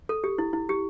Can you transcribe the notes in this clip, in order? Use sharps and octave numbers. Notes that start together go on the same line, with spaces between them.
A4
G4
E4
E4
G4